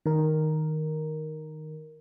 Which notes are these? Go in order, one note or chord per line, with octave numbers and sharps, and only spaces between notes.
D#3 A#4